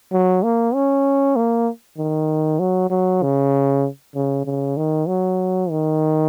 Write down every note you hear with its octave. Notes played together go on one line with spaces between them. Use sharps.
F#3
A#3
C#4
A#3
D#3
F#3
F#3
C#3
C#3
C#3
D#3
F#3
D#3